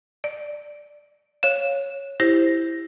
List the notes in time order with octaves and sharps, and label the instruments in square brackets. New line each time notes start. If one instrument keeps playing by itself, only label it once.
[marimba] D5
[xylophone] C#5 E7 [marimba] F5
[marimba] E4 G4 C5 [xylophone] A#6